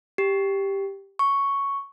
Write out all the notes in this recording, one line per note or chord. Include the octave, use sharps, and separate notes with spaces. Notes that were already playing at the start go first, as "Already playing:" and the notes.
G4
C#6